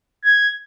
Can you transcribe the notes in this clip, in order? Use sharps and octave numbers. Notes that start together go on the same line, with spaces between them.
G#6